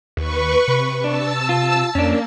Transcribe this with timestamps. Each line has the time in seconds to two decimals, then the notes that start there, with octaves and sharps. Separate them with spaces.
0.17 D#2 B4 C#6
0.68 C3
1.04 D4 A5 E6
1.49 F4
1.95 F2 A#3 C#4 D4